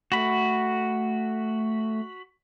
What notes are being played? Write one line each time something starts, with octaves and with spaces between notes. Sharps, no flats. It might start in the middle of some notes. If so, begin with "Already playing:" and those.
A3 F#4 B5